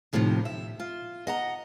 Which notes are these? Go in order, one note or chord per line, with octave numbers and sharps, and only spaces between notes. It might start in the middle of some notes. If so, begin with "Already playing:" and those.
D#2 A2 C3 D#3 F3
E5
F4
D#5 F#5 A#5